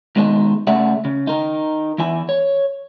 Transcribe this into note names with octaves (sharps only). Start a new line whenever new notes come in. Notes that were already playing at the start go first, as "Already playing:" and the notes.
G#2 B2 D#3 G#3 D4 D#4
C#3 A3 G#4 D5 E5 F#5
C#3
D#4 A#4
E2 E3 E4 G#5
C#5